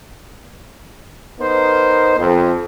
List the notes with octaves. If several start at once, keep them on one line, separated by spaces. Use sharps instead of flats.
B3 D#4 A#4 C5
F2